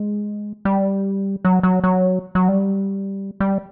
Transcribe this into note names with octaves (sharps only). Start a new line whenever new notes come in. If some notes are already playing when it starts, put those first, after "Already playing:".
Already playing: G#3
G3
F#3
F#3
F#3
F#3
G3
G3